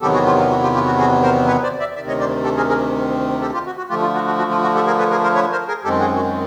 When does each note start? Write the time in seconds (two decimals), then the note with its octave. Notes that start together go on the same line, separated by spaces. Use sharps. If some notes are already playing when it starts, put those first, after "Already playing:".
0.01 E2 C3 D#3 F#3 B3 G4 A4
0.13 F#4 G#4
0.25 F4 G4
0.39 F4
0.50 F#4
0.63 F4 G4
0.74 F4 G4
0.86 F#4
0.98 F#4 G#4
1.23 A#4 C5
1.47 B4 C#5
1.63 C5 D5
1.79 D5 E5
1.96 D2 C3 D#3 D5 E5
2.08 C#5 D#5
2.20 C5 D5
2.44 G4 A4
2.57 G#4 A#4
2.69 G#4 A#4
3.41 G4 A4
3.54 F4 G4
3.66 F#4
3.78 F#4
3.90 D3 F3 A3 F4 G4
4.02 F4
4.15 F#4
4.26 F#4
4.38 F#4
4.51 F4
4.63 F#4
4.75 G4 A4
4.87 G#4 A#4
4.99 A4 B4
5.11 G#4 A#4
5.23 A#4 C5
5.35 B4 C#5
5.52 A#4 C5
5.68 G#4 A#4
5.84 F#2 D#3 G#3 C4 G4 A4
6.00 F#4 G#4
6.16 F#4